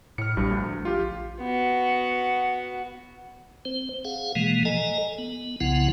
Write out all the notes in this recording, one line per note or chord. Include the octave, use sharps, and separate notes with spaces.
A2 F6 C#7
A#1 G2 G3
D2
F4 G4
B3 F#4
C4 C5
G#4 F5 F#5
B2 E3 F3 G#3 A#3
A4 D#5 G#5 A#5
B3
C2 C#3 F3 B3 E4 F#5